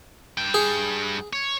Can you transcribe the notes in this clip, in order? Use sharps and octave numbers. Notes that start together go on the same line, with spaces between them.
G2 G5
G#4
C#5